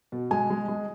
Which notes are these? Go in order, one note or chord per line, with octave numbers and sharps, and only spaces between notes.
B2
G#3 G#5
G#3
G#3